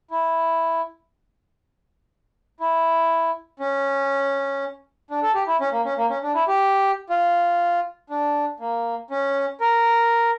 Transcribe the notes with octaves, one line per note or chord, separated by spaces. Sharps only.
E4
E4
C#4
D4
A4
G4
E4
C#4
A#3
C#4
A#3
C#4
D4
E4
G4
F4
D4
A#3
C#4
A#4